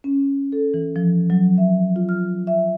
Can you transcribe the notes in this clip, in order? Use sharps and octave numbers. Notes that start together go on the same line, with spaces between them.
C#4
A4
E3
F3
F#3
E5
F4
F6
E5